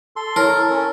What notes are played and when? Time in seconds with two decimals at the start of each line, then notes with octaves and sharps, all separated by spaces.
0.16 A4 C6
0.36 E4 A4 A#4 C#5
0.70 C#4 A4